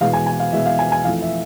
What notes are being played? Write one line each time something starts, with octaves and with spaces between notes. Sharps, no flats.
E2 B2 G#3 F5
G#5
G#5
F5
E2 B2 G#3 E5
F5
G#5
G#5
F2 E3 A3 F5
E5